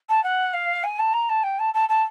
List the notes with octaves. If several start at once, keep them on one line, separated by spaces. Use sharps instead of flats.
A5
F#5
F5
G#5
A5
A#5
A5
G5
A5
A5
A5